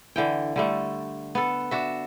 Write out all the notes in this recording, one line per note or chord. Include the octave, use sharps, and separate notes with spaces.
D3 E3 G5
D3 G3 A3
B3 A4
D4 F#4 E5